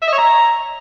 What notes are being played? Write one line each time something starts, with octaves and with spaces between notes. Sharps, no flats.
E5
D#5
C#5
A#5